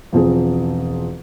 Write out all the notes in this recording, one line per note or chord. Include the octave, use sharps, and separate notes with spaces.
E1 F3 C4 G#4